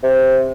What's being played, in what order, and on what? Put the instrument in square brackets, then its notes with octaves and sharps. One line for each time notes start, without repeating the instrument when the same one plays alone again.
[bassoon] C3